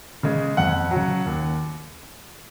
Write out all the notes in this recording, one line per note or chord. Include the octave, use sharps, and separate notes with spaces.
C#3 G#3
F2 F#5
C#3 F#3
D#2